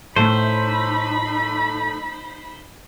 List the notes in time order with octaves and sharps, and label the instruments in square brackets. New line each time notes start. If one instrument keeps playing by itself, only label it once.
[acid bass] A2 [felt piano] A3 [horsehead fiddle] D#4 B5 [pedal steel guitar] C5